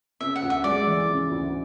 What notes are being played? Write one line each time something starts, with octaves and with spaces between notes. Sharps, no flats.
C#3 E5
F#5
D2
E5
G#3 D5
E3
C#3
D2